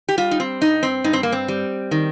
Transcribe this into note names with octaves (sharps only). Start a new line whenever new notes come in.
G4
G3 F4
D#4
C4
G2 D#4
C4
G2 D#4
C4
A#3
C4
G3
D#3